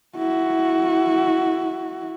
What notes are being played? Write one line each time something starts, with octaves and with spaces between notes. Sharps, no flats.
E4 F#4